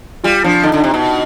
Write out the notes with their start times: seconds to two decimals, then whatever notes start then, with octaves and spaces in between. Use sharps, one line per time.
0.24 G3 F4
0.44 F3 D4
0.63 D3 D#4
0.74 D3
0.84 C3
0.94 B2